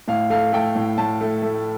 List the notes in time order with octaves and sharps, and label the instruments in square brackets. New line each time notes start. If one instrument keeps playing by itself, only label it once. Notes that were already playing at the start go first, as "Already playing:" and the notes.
[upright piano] A2 F5
A3 F5
A3 G5
A2
A2 A5
A3
A3